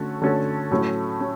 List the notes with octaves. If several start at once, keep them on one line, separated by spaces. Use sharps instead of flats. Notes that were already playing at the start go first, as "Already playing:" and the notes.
Already playing: D3 A3 C#4 F#4 A4
D3 A3 C#4 F#4 A4
A2 F#3 A3 C#4
C#4